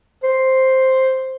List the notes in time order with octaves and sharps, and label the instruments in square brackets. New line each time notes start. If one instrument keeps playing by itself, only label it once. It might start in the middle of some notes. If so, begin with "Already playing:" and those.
[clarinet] C5